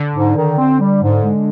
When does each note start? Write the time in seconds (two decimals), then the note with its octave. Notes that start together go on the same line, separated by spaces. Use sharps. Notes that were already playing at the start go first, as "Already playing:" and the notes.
Already playing: D3
0.14 G#2
0.36 D#3
0.58 C4
0.80 G3
1.01 G#2
1.23 G#3